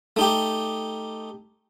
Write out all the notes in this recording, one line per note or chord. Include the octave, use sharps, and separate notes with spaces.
A3 D#4 G4